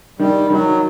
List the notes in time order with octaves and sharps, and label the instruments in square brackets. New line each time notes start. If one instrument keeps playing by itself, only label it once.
[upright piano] D#3 [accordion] G3
[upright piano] D#3 [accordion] F#3